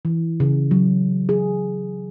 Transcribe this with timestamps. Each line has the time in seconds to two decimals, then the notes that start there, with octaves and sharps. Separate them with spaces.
0.05 E3
0.40 C#3
0.71 F#3
1.29 G#4